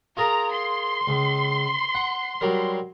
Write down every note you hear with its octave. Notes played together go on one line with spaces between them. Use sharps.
F4 G#4 A#4 A#5
C6
C#2
F#5
F#3 G3 A#4